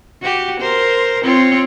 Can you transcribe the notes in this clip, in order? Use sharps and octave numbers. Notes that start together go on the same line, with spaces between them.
F#4 G4
A#4 C5
C4 F4 C#5